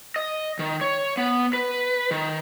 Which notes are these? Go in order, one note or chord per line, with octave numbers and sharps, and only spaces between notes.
D#5
D#3
C#5
B3
B4
D#3